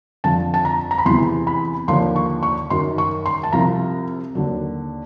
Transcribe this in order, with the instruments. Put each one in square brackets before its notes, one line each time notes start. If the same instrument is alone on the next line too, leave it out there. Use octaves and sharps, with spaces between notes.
[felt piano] F2 D3 F3 A5
A5
A#5
A#5
B5
E2 C3 E3 C6
B5
D#2 D3 F3 C6
C#6
C#6
F#2 D#3 F#3 C6
C#6
C6
A5
C2 C3 F3 A#5
D#2 D3 F#3